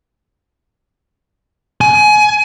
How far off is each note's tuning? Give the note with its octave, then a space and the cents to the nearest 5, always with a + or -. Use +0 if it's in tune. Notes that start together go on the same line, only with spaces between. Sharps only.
G#5 +25